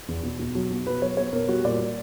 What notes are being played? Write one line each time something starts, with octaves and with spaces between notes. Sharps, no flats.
E2
B2
B2
F#3
B2
B2 B4
F#3 C#5
B2 C#5
B2 A#4
G3 F#4
A#2 D5
A#2